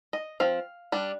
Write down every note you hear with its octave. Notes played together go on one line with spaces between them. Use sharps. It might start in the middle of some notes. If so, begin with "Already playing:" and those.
D#5
F3 C4 F5
G3 D4